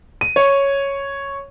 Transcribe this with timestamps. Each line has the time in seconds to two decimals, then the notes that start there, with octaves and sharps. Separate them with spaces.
0.21 D#7
0.36 C#5